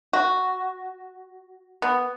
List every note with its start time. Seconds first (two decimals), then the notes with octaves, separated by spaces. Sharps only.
0.13 F#4
1.82 B3